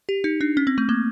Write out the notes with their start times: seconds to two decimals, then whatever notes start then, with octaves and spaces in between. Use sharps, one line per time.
0.09 G4
0.24 D#4
0.41 D4
0.57 C#4
0.67 C4
0.78 A3
0.89 A#3